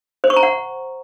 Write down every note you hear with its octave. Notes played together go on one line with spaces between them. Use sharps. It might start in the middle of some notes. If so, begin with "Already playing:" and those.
C5
C#6
A#5
F#5